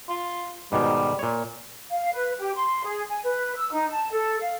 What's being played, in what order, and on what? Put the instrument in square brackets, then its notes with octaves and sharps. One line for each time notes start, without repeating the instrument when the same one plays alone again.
[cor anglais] F4
[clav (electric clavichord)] G#2 B2 D#3 [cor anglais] G3
[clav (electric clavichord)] A#2 C#5
[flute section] F5
B4
G4
C6
G#4
G#5
B4
E6
D#4
A5
A4
F5